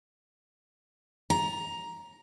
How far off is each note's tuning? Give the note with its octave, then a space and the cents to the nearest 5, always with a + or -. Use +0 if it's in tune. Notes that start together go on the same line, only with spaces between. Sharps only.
A#5 +10